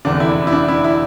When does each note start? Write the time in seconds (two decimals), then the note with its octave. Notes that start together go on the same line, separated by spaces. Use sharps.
0.05 F1 E2 D3 D4
0.20 E4
0.47 E4
0.52 D4
0.68 E4
0.84 E4